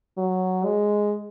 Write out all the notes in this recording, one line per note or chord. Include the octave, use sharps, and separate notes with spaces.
F#3
G#3